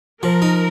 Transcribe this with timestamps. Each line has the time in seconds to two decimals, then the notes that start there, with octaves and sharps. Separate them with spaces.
0.23 F3 A#4
0.42 D#4